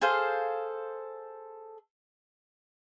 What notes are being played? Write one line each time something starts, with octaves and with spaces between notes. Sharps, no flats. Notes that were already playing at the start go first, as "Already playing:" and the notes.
G#4 A4 C5 F5